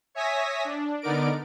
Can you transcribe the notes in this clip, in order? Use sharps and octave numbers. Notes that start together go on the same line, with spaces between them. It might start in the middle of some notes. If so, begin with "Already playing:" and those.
C#5 E5 G#5 D#6 A#6 B6
D4
D3 B3 D#4 A#4 D5 D7